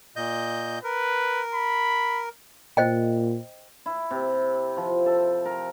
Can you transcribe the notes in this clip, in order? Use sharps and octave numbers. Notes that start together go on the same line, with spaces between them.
A#2 D#5 G6
A#4 B4
B5
A#2 C5 D#5 G5
E4
C3
F3
A4
A#4